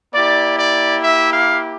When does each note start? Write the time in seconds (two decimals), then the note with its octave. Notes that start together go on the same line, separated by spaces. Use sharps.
0.14 A#3 E4 G4 D5
0.59 D5
1.04 E5
1.33 F5